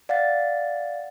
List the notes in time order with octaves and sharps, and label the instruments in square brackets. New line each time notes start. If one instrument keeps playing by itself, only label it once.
[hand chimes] D5 F5 F#5 A6